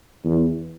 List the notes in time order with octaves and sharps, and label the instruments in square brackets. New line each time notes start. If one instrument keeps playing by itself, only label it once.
[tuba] E2